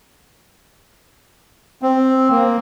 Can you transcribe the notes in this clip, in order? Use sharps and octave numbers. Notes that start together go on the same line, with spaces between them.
C4
A#3